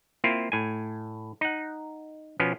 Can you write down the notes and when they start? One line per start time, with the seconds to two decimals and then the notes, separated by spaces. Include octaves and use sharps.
0.24 A#3 C4 E4 F4
0.52 A2 G#5
1.41 D#4 F#5
2.39 B2 F3 B3 C#4